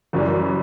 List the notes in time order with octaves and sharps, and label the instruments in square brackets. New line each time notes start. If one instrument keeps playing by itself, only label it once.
[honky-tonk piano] F#1 F#2 E3 G3